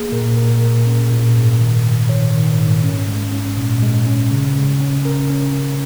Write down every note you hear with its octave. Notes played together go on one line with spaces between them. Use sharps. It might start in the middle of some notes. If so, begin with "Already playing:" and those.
Already playing: A#3 G#4
A#2 A#4
A#2 A#4
A#2 A#4
C#4
A#2
G#2
D#3
G#2
D#3 C#5
D#3
G#2
C#4
G#3
C#4
A#2
G#3
C#4
C#3
C#3
C#4
C#4 A#4
C#4
C#4